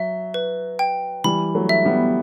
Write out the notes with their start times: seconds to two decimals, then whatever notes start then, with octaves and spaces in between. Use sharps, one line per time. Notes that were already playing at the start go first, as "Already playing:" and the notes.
Already playing: F#3 E5
0.34 B4
0.79 G5
1.24 E3 G3 B5
1.55 F#3 A3
1.69 E5
1.85 G3 B3